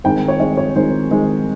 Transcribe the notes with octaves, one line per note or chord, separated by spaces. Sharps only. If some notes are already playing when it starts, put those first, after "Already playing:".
D#3 G#3 C4 G5
C#5
D#3 G#3 C4 D#5
C#5
D#3 G#3 C4 C5
D#3 G#3 C4